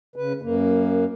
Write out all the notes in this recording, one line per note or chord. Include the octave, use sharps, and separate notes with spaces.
C#3 B4
F#2 A#3